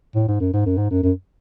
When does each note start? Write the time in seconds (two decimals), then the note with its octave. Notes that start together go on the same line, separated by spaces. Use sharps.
0.15 A2
0.28 G#2
0.40 F#2
0.53 G#2
0.66 F#2
0.78 G#2
0.91 F#2
1.03 F#2